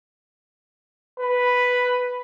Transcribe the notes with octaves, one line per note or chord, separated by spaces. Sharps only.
B4